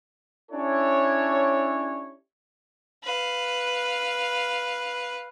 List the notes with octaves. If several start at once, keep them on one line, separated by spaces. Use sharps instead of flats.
C#4 D4 E4 G4 A4 C#5
B4 F5